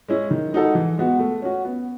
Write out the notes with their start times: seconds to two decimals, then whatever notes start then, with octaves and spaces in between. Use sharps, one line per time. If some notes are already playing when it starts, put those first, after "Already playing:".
0.08 G#3 C#4 E4
0.31 D#3
0.53 G#3 D#4 F#4 A4
0.75 E3
0.98 G#3 B3 F#4
1.19 A3
1.42 C#4 F#4
1.65 B3